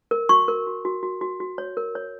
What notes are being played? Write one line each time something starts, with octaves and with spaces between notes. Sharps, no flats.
A#4
F#4 C#6
A#4
F#4
F#4
F#4
F#4
F#4
C#5
A#4
C#5